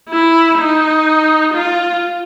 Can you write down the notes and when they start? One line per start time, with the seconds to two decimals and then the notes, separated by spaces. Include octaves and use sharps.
0.10 E4
0.59 D#4
1.54 F4